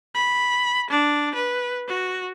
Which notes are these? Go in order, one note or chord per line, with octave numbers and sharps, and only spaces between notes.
B5
D4
B4
F#4